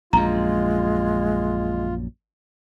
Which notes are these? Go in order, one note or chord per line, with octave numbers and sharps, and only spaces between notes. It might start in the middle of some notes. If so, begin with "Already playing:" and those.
A#1 F#2 G#3 F4 A#5